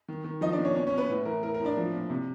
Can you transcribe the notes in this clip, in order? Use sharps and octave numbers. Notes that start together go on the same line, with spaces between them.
D#3
D#3
F3 D#4 D#5
D4 D5
A#2
C#4 C#5
B2 C#4 C#5
C#4 C#5
B2 B3 B4
A2
E3 A#4
A2 A#4
A#4
A2
D4 D5
F3
A#2
C3